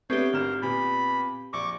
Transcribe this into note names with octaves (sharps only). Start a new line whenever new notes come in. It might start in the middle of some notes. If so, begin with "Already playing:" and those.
A3 B3 C4 D4 G4 C#5
G#1 A#4 E7
A#2 B3 B5
A#1 C#6 D6